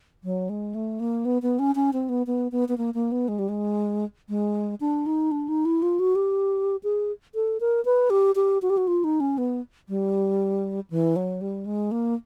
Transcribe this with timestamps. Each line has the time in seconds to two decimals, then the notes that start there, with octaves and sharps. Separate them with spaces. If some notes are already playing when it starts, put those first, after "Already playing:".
0.24 F#3
0.49 G#3
0.75 A3
1.00 A#3
1.25 B3
1.42 B3
1.59 C#4
1.75 C#4
1.93 C4
2.09 B3
2.27 B3
2.52 B3
2.68 B3
2.78 A#3
2.94 A#3
3.12 B3
3.28 G#3
3.39 G3
3.49 G#3
4.29 G#3
4.81 D4
5.06 D#4
5.31 D4
5.48 D#4
5.65 E4
5.82 F4
5.99 F#4
6.15 G4
6.83 G#4
7.35 A4
7.60 A#4
7.85 B4
8.10 G4
8.36 G4
8.62 F#4
8.70 G4
8.77 F#4
8.87 F4
9.04 D#4
9.20 C#4
9.38 B3
9.89 G3
10.90 E3
11.16 F#3
11.41 G3
11.66 G#3
11.91 A#3